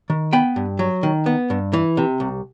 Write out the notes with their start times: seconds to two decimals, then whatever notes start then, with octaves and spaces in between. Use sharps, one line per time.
0.10 D#3
0.33 B3 G5 B5
0.56 G2
0.79 F#3
1.03 D#3
1.26 B3
1.50 G2
1.73 E3
1.97 C3
2.20 C2